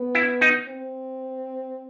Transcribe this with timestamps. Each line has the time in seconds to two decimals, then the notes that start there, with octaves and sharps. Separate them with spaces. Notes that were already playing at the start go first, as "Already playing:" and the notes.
Already playing: B3
0.15 E4
0.41 D#4
0.68 C4